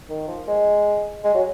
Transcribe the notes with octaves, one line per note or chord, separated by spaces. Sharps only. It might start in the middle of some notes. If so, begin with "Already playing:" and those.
D#3
F3
G#3
G#3
F#3